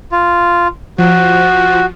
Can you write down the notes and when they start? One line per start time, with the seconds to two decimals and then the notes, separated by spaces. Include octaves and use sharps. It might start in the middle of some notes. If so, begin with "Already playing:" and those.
0.12 F4
0.98 F3 F#4